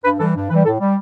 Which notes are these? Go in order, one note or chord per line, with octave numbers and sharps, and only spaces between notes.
G2 B4
E3 G3 A4
G2
E3 G3 B4
A2 A4
G3